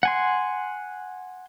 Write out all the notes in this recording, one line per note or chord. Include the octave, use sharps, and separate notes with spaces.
F#5 G#5 C6